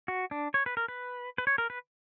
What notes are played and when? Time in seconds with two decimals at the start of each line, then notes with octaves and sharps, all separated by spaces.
0.08 F#4
0.31 D4
0.54 C#5
0.66 B4
0.77 A#4
0.88 B4
1.38 B4
1.47 C#5
1.58 A#4
1.70 B4